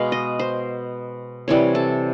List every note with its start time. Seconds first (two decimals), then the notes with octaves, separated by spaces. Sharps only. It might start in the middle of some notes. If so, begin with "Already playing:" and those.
Already playing: B2 G#3 B3 F5
0.12 D#5
0.39 C5
1.48 C3 E3 G3 C#5
1.75 A4